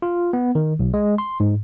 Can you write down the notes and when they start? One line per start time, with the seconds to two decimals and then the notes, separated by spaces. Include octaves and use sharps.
0.02 F4
0.33 B3
0.55 D#3
0.79 B1
0.94 G#3
1.18 C6
1.40 G#2